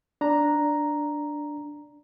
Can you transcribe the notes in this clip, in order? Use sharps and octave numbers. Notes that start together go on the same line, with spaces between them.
D4 A#5